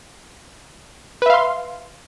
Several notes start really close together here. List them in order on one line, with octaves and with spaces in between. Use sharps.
B4 E5 F5 C6